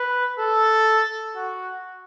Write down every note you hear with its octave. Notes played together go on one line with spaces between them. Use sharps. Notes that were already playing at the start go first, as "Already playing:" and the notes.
Already playing: B4
A4
F#4